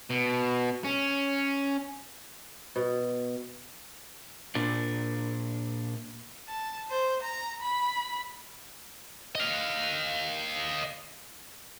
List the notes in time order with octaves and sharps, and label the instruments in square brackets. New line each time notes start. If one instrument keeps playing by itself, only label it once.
[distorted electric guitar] B2
C#4
[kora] B2
[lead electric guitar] A#2 D4
[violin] A5
C5
A#5
B5
[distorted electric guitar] D#5 F5